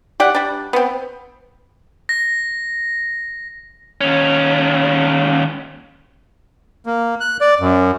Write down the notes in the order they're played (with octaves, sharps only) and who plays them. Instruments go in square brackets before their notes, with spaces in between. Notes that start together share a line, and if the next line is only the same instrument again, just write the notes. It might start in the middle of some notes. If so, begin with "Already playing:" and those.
[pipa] G4 D5 F#5
G3 D4
B3 C4
[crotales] A#6
[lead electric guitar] D#2 C#4
[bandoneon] A#3
F#6
D5
F#2